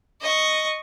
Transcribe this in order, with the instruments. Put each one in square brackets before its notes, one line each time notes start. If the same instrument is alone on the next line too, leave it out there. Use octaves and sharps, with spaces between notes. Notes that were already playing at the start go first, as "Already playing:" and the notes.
[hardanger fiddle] D#5 C#6